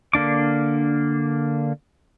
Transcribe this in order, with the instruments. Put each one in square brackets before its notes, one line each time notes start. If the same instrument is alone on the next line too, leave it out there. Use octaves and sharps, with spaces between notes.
[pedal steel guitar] D3 A#3 D4 D6